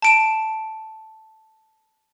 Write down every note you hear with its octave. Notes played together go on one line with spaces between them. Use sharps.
A5 D7 E7